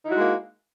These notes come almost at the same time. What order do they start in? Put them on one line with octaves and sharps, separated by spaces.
D#4 E4 F#4 G#3 A#3